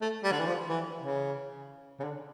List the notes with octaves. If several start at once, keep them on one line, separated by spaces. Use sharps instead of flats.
A3
G3
D3
E3
F3
E3
C#3
C#3
D3